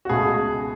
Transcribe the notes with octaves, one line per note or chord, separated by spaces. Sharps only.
F#4
C#2 B2 A3 G#4